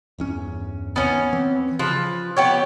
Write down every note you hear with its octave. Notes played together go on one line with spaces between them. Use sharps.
G1 E2 C#4
D#2 B3 C#4
E3 C4
C#3 F3 B4
B3 G4 C#5